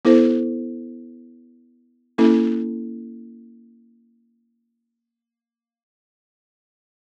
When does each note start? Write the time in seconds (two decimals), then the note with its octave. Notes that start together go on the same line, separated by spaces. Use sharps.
0.05 B3 E4 A4 C5
2.18 A#3 C#4 E4 A4